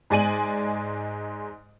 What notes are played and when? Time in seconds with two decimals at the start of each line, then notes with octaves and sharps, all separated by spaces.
0.10 G#2 G#3 D5 G#5 D#7 F#7